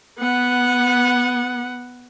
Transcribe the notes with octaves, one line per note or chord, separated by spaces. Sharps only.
B3 F#5